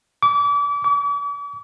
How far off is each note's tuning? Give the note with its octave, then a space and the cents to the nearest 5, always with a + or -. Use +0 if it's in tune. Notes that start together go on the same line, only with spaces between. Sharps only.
D6 -35
D6 -45